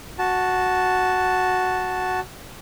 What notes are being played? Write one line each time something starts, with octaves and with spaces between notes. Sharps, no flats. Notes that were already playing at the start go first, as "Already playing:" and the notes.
F#4 A5